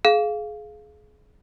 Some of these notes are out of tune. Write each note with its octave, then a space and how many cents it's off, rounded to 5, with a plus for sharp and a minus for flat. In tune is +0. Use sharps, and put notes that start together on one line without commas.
G#4 +30 F5 +0